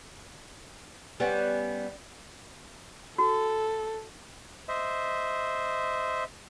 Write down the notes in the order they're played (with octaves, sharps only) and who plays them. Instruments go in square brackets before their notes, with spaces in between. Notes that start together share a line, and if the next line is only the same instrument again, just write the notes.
[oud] G3 B3 C#4
[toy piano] F#4 [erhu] A4
[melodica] C5 D#5 E5